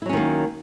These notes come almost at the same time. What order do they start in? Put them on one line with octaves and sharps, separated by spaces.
E4 F#3 C#4 D#3 A#3